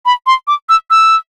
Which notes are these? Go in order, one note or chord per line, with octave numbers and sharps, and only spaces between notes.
B5
C6
D6
E6
E6